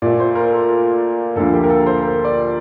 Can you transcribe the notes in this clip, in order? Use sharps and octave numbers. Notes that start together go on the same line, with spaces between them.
A#2 A3 D5
C5
A#4
A4
D2 D3 F3 A#3 A4
G4
A#4
A4
C5
A#4
D5